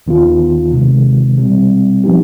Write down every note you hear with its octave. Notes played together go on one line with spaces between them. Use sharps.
D#2 D#3 B3 F4
C3 D#3 G#3
B2 G3 C4
F3 B3 D#4 G4